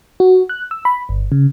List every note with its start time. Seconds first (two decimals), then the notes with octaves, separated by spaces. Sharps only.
0.20 F#4
0.49 F#6
0.71 E6
0.85 B5
1.09 G1
1.32 C#3